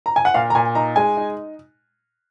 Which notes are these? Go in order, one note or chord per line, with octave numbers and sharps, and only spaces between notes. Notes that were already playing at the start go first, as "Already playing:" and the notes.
A#5
G#5
F#5
A#2 F5
A#5
A#2 G#5
D#4 A#5
G#3 G#5
D#4